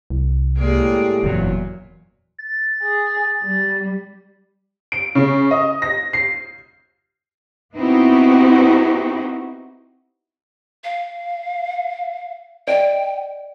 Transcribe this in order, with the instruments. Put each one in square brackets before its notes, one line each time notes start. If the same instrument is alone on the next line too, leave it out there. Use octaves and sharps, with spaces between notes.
[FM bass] C2
[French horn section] A2 G4 [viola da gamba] G#3 A#3 D5
[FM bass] F#1 [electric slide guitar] E2 F#3 [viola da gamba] A#2
[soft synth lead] A6
[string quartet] G#4
G3
[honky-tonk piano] D7
C#3
D#5
A#6
C7
[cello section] B3 C4 D#4 E4 F#4 G4
[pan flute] F5
[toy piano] D5 D#5 [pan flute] G5